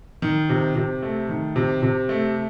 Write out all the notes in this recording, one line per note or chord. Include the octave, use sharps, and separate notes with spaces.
D#3
C3
C3
A3
D#3
C3
C3
A3